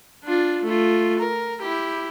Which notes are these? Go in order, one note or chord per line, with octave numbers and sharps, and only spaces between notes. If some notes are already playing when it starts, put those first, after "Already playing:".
D4 F4
A3 F4
A#4
E4 G4